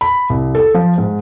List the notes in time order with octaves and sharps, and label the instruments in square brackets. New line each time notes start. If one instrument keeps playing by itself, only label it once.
[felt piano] B5
C2
A4
F3
G#2